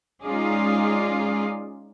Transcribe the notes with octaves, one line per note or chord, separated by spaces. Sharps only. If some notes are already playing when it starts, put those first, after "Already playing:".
G#3 C#4 D#4 F4 G#4 D5